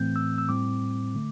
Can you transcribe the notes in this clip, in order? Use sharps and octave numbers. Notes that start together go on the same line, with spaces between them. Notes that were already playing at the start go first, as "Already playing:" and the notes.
Already playing: A2 E3 A3 C4 G6
E6
E6
A2 G3 C4 D6
D3 A3